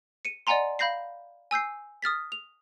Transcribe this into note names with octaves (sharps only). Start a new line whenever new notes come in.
C#7 D#7
D5 D#5 F#5 G#5 A#5 C6
F5 B5 G6 A#6 C7
G#5 E6 G6 C7
D#6 F6 A6 B6
F7